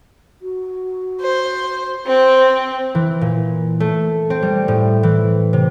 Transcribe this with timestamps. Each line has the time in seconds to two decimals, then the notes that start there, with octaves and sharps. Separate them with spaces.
0.42 F#4
1.21 C5
2.06 C4 C5
2.95 E3
3.21 A#2
3.80 A3
4.30 C4
4.42 G3
4.68 A2
5.03 E3
5.53 C3